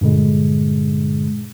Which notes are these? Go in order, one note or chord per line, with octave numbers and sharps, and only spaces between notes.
G2 A#2 D3 G#3